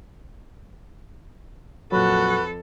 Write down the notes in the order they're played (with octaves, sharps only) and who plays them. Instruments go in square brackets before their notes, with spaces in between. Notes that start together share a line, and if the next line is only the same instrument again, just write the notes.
[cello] F2 A4 [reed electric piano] A#2 F#3 [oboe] F#4 [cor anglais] B4